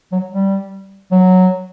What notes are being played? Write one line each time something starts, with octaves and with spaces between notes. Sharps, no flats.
F#3
G3
F#3